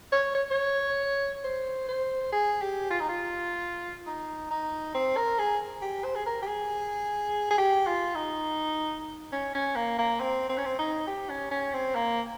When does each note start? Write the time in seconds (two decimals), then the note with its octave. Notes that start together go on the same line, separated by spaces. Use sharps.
0.12 C#5
0.35 C#5
0.50 C#5
1.44 C5
1.88 C5
2.32 G#4
2.61 G4
2.90 F4
3.00 D#4
3.09 F4
4.07 D#4
4.51 D#4
4.94 C4
5.17 A#4
5.39 G#4
5.82 G4
6.04 C5
6.15 G#4
6.26 A#4
6.42 G4
6.47 G#4
7.51 G#4
7.58 G4
7.87 F4
8.15 D#4
9.32 C#4
9.54 C#4
9.76 A#3
9.98 A#3
10.20 C4
10.49 C4
10.57 C#4
10.65 C4
10.79 D#4
11.07 G4
11.30 C#4
11.51 C#4
11.73 C4
11.95 A#3